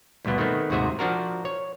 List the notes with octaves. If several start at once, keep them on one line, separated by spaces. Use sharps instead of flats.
D2 G2 B2 B3
D#3 A3 B3 C4
D#2 G#2 C3 F#4 G#4 E5
F3 D4 F#4 A#4
C#5